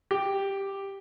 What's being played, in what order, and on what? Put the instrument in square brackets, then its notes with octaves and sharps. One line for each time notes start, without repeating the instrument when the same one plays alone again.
[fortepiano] G4